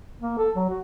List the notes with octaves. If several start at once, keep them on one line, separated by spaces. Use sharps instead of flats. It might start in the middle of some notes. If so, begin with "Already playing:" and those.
A#3
A4
F#3
F#4